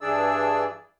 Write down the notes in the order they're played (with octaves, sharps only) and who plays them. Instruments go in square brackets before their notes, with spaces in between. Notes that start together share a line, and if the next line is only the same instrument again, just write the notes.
[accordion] G2 E3 D4 G#4 D5 E6